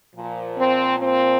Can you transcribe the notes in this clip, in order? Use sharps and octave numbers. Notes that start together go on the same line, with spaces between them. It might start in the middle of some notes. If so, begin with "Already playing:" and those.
A#2 F3
C4
C4